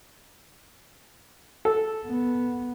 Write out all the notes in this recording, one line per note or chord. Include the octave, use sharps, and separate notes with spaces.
A4
B3